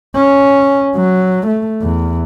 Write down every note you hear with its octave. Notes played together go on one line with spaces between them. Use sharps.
C#4
F#3
A3
E2